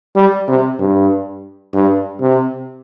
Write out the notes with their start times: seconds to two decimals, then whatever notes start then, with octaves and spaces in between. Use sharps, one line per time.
0.16 G3
0.48 C3
0.79 G2
1.74 G2
2.21 C3